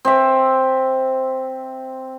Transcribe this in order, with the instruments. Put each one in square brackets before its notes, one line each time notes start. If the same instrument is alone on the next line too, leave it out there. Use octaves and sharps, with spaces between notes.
[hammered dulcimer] C4 E5